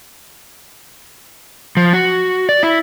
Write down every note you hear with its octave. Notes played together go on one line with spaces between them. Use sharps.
F3
F#4
D5
E4